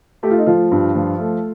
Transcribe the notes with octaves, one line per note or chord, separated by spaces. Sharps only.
A3 G4
F4
D#4
F3 F4
G2
F3
A3